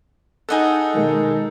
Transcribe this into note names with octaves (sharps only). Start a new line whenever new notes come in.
D#4 G#4 A4 D#5 F#5
B2 D#3 G#3